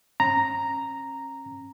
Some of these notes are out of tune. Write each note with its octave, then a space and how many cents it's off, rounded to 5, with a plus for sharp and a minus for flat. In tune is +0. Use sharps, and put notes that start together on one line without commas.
C#4 -35 A#5 -5